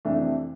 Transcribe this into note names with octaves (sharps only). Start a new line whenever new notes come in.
F2 C3 E3 A3 D4